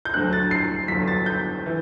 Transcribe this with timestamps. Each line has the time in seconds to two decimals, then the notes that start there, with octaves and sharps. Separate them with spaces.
0.05 G6
0.14 D2 D3 F#3 F#6
0.33 A6
0.51 C7
0.88 G1 G2 D3 F#3 B6
1.08 A6
1.26 G6
1.66 E3